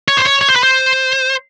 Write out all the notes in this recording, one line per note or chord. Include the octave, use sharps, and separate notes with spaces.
C#5
C5
C#5
C#5
C5
B4
C5